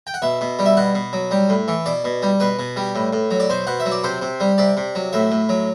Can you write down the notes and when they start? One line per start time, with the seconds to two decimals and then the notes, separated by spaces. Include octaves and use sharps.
0.07 G5
0.14 F#5
0.22 B2 E5
0.41 B2
0.59 G3
0.66 E5
0.77 B2 F#5
0.95 B2
1.13 F#3
1.31 G3
1.49 A2
1.68 E3
1.86 B2 D5
2.04 B2
2.22 G3
2.40 B2 B4
2.59 B2
2.76 G3
2.95 A2
3.13 A2
3.31 F#3
3.40 D5
3.50 B2 C5
3.67 B2 F#5
3.80 E5
3.86 F#3
3.92 D5
4.04 C3 C5
4.22 C3
4.40 G3
4.58 C3 D5
4.77 C3
4.95 F#3
5.13 A2 E5
5.31 A2
5.49 F#3